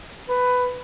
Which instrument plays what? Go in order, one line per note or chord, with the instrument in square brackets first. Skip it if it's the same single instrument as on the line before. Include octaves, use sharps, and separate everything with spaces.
[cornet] B4